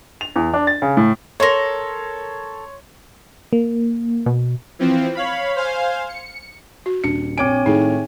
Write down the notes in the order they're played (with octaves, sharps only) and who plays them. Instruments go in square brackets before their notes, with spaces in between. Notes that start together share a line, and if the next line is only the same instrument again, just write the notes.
[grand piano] F7
E2
D4
A6
C#3
A2
[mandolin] A4 A#4 [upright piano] C#5 C6
[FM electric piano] A#3
[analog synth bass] B2
[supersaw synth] E3 F3 C4
C#5 F5 B5
C5 F5 G#5
C#7
[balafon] F#4
[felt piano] D#1 C#7 [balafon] D4
[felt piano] A#1 D6 D7 [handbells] C4 C#5 G#5
[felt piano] A2 D#3 [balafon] D#4 G#4